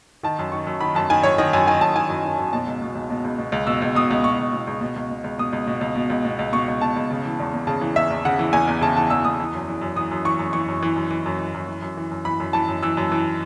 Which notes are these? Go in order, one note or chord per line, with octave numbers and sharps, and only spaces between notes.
D#3 A5
F#2
D#3 C#6
F#2
D#3 B5
F#2 A5
D#3 G#5
F#2 C#5
D#3 D#5
F#2 G#5
D#3 G#5
F#2 A5
D#3 G#5
F#2
D#3
F#2
B2 A5
C#2
B2
C#2
B2
C#2
B2
C#2
B2 E6
C#2
B2 D#6
C#2
B2 C#6
C#2
B2
C#2
B2
C#2
B2
C#2
B2 D#6
C#2
B2
C#2
B2
C#2
B2
C#2
B2 C#6
C#2
B2 A5
C#2
C#3
E3
E2
E2
C#3 A5
E3
E2 E5
E2
C#3 F#5
E3
E2 G#5
E2
C#3 A5
E3 A5
E2 E6
E2 D#6
E3
F#2
E3
F#2
E3 D#6
F#2
E3 C#6
F#2
E3 C#6
F#2
E3
F#2
E3
F#2
E3
F#2
E3
F#2
E3
F#2
E3 B5
F#2
E3 A5
F#2
E3 E6
F#2
E3